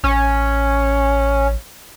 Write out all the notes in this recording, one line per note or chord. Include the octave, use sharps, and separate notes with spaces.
A1 C#4